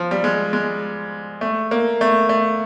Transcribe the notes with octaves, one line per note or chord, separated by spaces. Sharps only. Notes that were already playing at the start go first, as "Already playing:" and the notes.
Already playing: F3
G3
G#3
G#3
A3
A#3
A3
A3